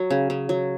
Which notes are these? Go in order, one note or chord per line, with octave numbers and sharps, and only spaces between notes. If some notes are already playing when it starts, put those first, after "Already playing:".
Already playing: F#3
C#3
C#3
F#3